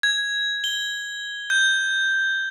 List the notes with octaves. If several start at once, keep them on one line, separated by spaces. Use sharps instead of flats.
G#6
G7
G6